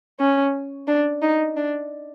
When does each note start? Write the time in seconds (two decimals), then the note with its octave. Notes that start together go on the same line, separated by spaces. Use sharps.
0.20 C#4
0.88 D4
1.22 D#4
1.57 D4